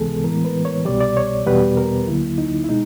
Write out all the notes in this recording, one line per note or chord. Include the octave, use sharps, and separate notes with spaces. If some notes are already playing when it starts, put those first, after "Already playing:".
Already playing: C#2 C3 E3 G#3 B3 G#4 A4
A2 E3 G#3 B3 A#4
B4
C#5
C2 B2 G3 D5
D5
C#5
E2 B2 G3 B3 B4
A#4
D2 D3 F#3 A#3 E4
D#4
E4
B2 G#3 D#4